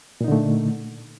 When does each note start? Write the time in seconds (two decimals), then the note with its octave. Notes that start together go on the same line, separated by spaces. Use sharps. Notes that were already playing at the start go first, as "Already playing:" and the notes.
0.21 A#2
0.24 D#4
0.28 D3
0.32 A3